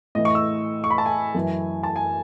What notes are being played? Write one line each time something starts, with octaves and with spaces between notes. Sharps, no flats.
A2 E3 D#5
C#6
E6
C#6
B5
A5
G#5
F#2 E3
A5
G#5